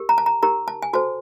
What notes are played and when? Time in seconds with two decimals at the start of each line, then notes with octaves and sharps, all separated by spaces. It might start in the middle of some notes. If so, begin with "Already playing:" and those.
Already playing: G4 A#4
0.09 A#5
0.18 A5
0.26 A#5
0.43 D#4 G4 A#4 A#5
0.68 A5
0.83 G#5
0.93 F#4 A4 C5 A5